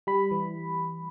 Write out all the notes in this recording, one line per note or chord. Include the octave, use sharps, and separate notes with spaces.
G3 B5
E3